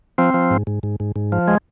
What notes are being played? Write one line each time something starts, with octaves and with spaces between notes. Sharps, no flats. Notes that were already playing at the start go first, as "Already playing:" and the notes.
F3 C4
F3
G#2
G#2
G#2
G#2
G#2
F3
G#3